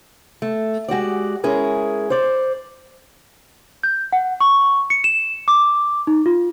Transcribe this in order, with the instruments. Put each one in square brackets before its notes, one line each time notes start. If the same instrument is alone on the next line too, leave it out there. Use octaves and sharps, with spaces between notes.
[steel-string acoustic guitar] A3
G#3 F#4 G4 D5
G#3 C#4 E4 G#4 A#4
C5 D5
[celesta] G6
F#5
C#6
C#7
E7
D6
D#4
F4